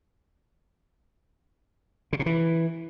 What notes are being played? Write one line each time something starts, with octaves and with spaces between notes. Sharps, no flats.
C#3
C3
E3